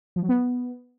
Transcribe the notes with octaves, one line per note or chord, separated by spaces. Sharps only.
F3
F#3
B3